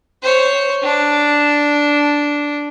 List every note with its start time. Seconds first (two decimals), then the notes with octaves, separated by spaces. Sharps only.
0.23 C5 C#5
0.83 D4